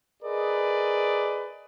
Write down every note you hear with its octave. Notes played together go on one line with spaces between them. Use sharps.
G#4 A#4 B4 D5 D#5